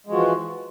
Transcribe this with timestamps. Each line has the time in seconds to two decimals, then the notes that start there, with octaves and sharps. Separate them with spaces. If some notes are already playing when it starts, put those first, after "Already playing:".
0.07 G#3
0.10 F3
0.12 F#4
0.15 E3